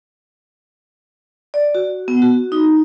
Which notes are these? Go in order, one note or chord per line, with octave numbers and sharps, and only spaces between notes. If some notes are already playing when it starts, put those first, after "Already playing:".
D5
F#4
B3
F#4
D#4